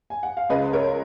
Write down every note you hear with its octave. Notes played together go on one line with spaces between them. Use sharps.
G#5
F#5
F5
C#2 C#3 B4 D#5
A#4 C#5